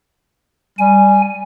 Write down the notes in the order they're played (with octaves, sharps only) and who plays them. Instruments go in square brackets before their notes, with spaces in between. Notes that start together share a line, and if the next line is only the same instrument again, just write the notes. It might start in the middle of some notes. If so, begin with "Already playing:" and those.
[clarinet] G3 [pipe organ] G#5